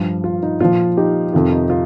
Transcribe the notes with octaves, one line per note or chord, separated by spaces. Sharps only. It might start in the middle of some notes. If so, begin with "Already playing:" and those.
Already playing: G2 F3
F4
D#4
A#2 F3 F4
D#4 G4
F2 C3 D#3 F4
D#4
F4